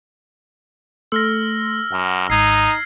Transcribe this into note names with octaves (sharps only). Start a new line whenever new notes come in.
A3 A4 C6 E6 F6 A#6
F#2 F#5
G#1 G#2 D#4 G#6 C7